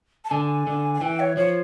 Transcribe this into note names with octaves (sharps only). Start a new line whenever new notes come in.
A5
D3 G#5
D3
G#5
E3 G5
C#5
F3 C#5